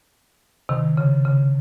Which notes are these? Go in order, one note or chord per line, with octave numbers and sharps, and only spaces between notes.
C3 D#3
C#3
C#3